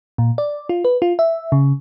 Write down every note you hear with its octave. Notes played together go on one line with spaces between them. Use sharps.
A#2
D5
F4
B4
F4
E5
C#3